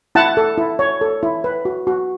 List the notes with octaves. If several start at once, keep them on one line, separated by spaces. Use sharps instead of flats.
E4 F#5 A5
A4
E4
C#5
A4
E4
B4
F#4
F#4